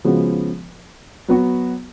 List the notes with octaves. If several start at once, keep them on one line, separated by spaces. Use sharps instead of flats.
C#3 F3 G#3 B3 F#4
F#3 B3 F#4